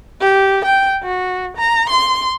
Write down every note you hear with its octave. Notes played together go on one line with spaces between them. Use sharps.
G4
G5
F#4
A#5
C6